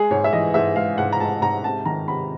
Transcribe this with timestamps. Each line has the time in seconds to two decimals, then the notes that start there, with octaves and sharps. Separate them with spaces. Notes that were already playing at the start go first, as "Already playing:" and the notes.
Already playing: G#3 G#4
0.11 G#2 C#5
0.24 E5
0.33 E3 D#5
0.54 G#2 E5
0.76 G#3 F5
0.98 G#2 F#5
1.13 A#5
1.20 G#2 A5
1.41 G#2 A#5
1.64 C3 A5
1.85 D#3 A#5
2.08 C3 B5